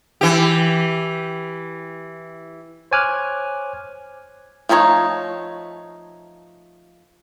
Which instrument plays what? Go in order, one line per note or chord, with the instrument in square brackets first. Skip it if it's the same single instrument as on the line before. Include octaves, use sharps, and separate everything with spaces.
[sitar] E3 G4
[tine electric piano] C5 C#5 G#5 D6 F6 F#6
[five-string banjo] F3 A3 D#4 E4 C#5